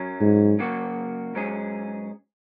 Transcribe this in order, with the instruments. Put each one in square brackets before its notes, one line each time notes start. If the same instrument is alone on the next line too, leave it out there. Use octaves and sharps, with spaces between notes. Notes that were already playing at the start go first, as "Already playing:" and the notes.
Already playing: [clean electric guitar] F#2 F#3 C#4
[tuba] G#2
[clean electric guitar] C#3 F#3 A#3 F#4
G#2 F#3 C#4 G#4